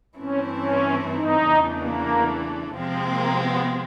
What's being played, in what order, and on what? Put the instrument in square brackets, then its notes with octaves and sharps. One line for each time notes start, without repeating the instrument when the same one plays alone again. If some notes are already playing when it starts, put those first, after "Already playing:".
[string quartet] G2 E3 A3 C4 E4 [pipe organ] C#4
[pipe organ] C#4
D#4
[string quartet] E2 C#3 E3 A3 D4
[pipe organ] A#3
[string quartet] C3 F3 G#3 C4
[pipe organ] A#3
B3